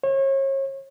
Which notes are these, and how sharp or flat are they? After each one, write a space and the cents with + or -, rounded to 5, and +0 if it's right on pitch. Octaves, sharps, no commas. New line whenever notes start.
C#5 -35